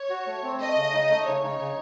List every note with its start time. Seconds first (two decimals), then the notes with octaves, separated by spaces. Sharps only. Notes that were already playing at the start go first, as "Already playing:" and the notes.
Already playing: C#5
0.10 F#4
0.27 A3
0.43 C4
0.60 A3 D#5
0.76 C#3
0.93 D#4
1.09 A3
1.26 C#3 C#5
1.43 D#4
1.59 C#3